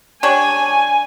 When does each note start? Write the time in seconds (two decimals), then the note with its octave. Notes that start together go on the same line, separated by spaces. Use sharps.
0.23 D4 G4 C#5 G#5